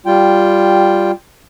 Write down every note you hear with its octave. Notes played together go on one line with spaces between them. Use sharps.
G3 F4 G5